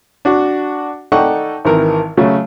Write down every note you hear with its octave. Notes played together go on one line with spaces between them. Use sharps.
D4 F#4
D#4 A4 D5 F#5 G5 C#6
G#1 D#3 E3 A#4
C#3 F#3 A3